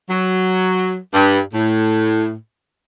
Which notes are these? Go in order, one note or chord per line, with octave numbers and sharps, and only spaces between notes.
F#3
G2
A2